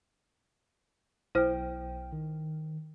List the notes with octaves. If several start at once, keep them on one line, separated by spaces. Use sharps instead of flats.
B1 E4 C5 G5 F6
D#3